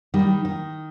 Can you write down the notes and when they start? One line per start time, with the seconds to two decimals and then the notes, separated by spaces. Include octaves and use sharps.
0.14 D#3 G3
0.45 D#3